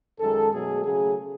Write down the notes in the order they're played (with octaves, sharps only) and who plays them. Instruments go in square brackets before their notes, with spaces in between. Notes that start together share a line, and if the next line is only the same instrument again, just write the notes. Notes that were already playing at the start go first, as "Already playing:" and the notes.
[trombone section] F#2 D#3 G#3 A4
B2 F#3 A3 G#4
C#3 F#3 A3 G#4